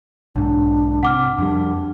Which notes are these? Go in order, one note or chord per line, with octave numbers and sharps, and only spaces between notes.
B1 G#2 D4
C3 F#5 D6 F6
F2 G3 D4